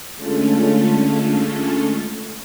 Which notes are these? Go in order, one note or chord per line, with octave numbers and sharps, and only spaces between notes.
D3 G#3 A3 C#4 F4 A4